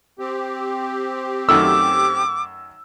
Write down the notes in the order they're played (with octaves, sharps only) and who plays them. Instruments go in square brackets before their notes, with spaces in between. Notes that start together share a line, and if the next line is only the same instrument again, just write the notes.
[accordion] C4 G4
[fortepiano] F#2 D#3 A3 [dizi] D6 [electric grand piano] E6